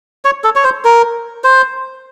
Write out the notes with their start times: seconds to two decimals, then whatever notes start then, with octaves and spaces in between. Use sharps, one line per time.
0.25 C#5
0.44 A4
0.56 C#5
0.64 C5
0.84 A#4
1.44 C5